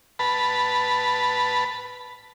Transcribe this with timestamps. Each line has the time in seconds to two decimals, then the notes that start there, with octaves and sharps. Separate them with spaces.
0.19 B4 A5 B5